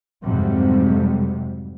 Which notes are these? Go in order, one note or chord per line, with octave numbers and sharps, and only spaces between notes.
F2 G#2 C3 F#3 G3